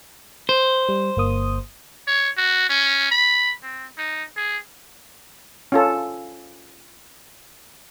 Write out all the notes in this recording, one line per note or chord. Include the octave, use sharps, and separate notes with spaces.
C5
G3
G1 A#3 D#6
C#5
F#4
C#4
B5
C4
D#4
G#4
C#4 F4 A4